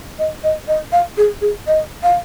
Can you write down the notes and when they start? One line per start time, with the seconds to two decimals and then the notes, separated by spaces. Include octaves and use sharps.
0.19 D#5
0.44 D#5
0.68 D#5
0.92 F5
1.17 G#4
1.41 G#4
1.67 D#5
2.03 F5